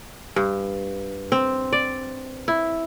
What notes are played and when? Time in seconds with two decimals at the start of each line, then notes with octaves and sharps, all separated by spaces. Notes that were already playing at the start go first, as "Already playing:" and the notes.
0.36 G2
1.32 C4
1.73 D5
2.48 E4